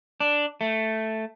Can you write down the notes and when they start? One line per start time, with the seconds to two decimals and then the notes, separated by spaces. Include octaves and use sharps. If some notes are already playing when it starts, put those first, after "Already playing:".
0.20 D4
0.61 A3